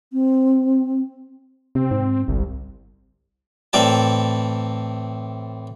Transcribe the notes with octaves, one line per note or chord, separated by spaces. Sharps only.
C4
C3 C4
G#2
G1 C2
A2 E3 C4 A#4 D5 A5